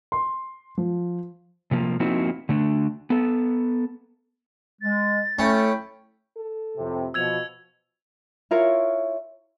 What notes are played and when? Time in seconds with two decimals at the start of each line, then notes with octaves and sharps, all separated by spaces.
0.12 C6
0.78 F3
1.71 C3 F3 A#3
2.00 F3 A#3 C4 D#4 E4 F#4
2.49 D3 A3 D4
3.10 B3 A4
4.82 G#3 A6
5.39 A3 C#4 E4 G5 B5
6.37 A4
6.77 F2 A2 C3
7.14 B2 F3 E6 G#6 F7
8.51 E4 F4 A#4 C#5